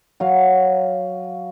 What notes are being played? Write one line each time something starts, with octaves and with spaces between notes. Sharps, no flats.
F#3 F5